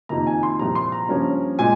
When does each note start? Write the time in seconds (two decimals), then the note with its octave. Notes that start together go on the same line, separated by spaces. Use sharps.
0.09 F2 C3 D#3 A#3 D#4 A#5
0.27 G#5
0.43 C6
0.59 C2 A#2 F3 A#5
0.75 C6
0.92 A#5
1.09 G2 F3 A#3 C#4
1.59 A#2 G#3 G#5